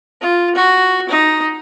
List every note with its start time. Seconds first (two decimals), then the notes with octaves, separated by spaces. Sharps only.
0.22 F4
0.56 F#4
1.09 D#4